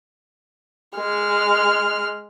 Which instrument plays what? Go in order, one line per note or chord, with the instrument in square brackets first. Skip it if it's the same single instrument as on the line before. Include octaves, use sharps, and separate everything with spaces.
[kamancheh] G#3 F6